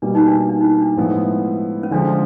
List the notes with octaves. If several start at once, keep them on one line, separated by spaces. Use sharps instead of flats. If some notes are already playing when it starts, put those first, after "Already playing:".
B2 G3 A#3 D4
D#4
D4
D4
D#4
E4
D4
A2 F3 G#3 B3 D4 E4
C#4
D3 F3 G#3 D4